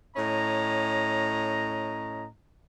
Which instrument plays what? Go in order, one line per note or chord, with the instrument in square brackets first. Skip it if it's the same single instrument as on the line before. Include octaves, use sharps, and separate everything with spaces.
[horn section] A2 C#4 D#5 A#5